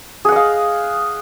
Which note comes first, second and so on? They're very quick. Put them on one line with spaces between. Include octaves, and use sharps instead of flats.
G#4 F#5 D#5 F5